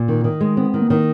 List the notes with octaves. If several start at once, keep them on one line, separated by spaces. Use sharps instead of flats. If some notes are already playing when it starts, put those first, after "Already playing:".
Already playing: A#2
D#3
D#3
G#3
B3 C4
D#3
A#3
D#3